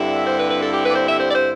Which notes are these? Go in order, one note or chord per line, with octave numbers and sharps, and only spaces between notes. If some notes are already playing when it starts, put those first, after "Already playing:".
Already playing: G2 D3 G3 C4 E4 E5
C5
B4
B4
A4
G4
B4
D5
C5
E5
C5
D5
C5